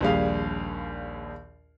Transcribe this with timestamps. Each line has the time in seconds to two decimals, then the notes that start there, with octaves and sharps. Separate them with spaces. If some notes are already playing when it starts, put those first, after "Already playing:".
0.01 A#1 D#2 G3 G#4 F5